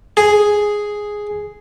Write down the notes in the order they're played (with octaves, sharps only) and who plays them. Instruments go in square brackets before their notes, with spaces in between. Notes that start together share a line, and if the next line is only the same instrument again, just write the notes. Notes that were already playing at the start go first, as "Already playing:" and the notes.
[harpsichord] G#4